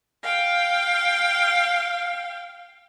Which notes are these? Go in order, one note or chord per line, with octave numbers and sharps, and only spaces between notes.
F5 G5